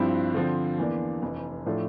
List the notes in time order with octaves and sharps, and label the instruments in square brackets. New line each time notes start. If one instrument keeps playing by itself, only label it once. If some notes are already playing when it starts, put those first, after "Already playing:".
Already playing: [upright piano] G2 F3 C4 E4
D3 F3 C4
E2 E3 A#3 D4
F1 F2 E3
A2 F3 A3 D4